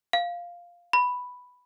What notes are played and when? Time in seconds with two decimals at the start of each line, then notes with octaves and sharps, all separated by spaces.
0.13 F5
0.93 B5